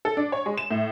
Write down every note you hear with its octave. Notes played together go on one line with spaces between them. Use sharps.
A4
D4
C#5
G#3
E7
A2